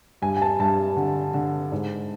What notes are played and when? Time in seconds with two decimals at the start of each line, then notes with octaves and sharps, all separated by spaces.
0.22 G2 G#5
0.37 G#5
0.42 A5
0.59 G2 A5
0.97 D3
1.34 D3
1.72 G#2